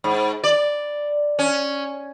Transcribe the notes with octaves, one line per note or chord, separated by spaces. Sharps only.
G#2
D5
C#4